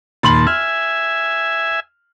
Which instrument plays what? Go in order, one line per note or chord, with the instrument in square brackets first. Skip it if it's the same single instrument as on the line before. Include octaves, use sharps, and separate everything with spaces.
[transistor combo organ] D#2 A#2 A5 [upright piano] B5 C6 F#7
[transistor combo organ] E5 G#5 [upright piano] F6